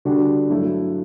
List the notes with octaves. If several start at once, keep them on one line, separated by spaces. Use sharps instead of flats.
D3 G3 D4 F#4
G2 F#3 A3 E4